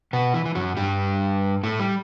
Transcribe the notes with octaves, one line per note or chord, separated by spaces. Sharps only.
B2 B3
E3
E3
F#2 F#3
G2 G3
A2 A3
G3